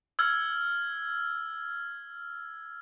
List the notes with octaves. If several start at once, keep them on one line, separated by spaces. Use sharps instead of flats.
E6 F6 G#6